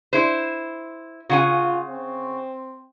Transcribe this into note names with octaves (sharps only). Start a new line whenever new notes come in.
E4 C5
C#3 F4 F#5 G#5
C4